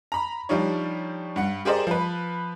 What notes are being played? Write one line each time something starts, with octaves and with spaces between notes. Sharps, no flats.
A#5 B5
F3 G3 D4 D#4 C#5
G2 F#5 C#7
G4 G#4 A#4 C5 D5 D#5
F3 B4